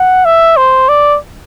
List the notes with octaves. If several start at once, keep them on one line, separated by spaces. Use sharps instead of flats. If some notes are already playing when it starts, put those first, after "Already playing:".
Already playing: F#5
E5
C5
D5